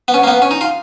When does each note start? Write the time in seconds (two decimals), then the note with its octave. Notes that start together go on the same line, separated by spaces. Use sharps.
0.08 B3
0.14 C#4
0.23 A#3
0.27 B3
0.42 C#4
0.51 D#4
0.61 F4